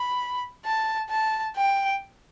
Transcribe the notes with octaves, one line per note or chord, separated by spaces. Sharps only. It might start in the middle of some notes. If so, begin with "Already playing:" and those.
Already playing: B5
A5
A5
G5